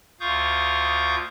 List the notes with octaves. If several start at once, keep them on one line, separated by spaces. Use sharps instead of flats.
D2 F4 F5 C#6 D#6 G6